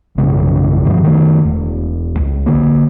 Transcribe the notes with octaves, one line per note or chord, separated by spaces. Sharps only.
A#1 F#2 C#3 G#3
G2 D3 D#3 F3
D#3 A3
E1
C#2
D3 A#3